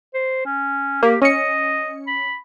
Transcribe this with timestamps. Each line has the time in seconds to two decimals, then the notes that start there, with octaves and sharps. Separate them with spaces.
0.14 C5
0.45 C#4
1.03 A#3 G4
1.22 C#4 D#5 C#7
2.07 B5